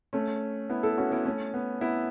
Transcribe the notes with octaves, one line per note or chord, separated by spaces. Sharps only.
A3 C#4
B3 E4
E4 A4
C#4 F#4
B3 E4
A3 C#4
B3
B3 E4